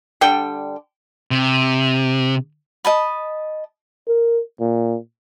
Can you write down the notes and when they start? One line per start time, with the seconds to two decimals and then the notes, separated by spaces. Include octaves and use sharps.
0.21 D3 G3 G5
1.31 C3
2.85 D#5 A5 B5
4.08 A#4
4.60 A#2